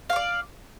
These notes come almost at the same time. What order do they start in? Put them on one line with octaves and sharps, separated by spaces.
F5 C#5 D5